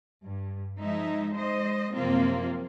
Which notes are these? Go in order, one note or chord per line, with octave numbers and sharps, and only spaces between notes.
G2
F3 G#3 D#4 E5
G#3 C5 D#5
F#2 C3 F3 A#3 C4 F4